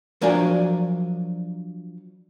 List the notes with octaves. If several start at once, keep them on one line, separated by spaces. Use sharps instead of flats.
F3 F#3 D4 A#4 D5 G#5